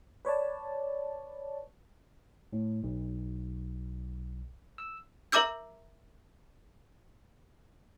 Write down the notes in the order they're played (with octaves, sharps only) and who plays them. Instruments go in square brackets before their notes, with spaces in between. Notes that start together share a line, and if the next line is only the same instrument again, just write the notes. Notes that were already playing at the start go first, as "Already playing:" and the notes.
[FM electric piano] B4 C#5 D5 A5
[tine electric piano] A2
B1
E6
[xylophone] A#4 E5 A#5 D6 E6 G6